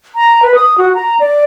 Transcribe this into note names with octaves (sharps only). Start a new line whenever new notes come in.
A#5
B4
D#6
F#4
A#5
D5